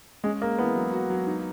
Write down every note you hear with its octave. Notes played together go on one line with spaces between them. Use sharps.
G#3 C#4
G#3 A#3
E3 B3
F#3
F#4
F#3
D#4